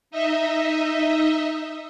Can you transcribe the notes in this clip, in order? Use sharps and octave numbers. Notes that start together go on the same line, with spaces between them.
D#4 D#5 E5